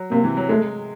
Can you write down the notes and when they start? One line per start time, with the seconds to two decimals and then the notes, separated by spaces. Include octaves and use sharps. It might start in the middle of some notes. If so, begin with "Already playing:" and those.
Already playing: F#3
0.11 C3 A#3
0.24 E3
0.37 F#3
0.49 G#3 A3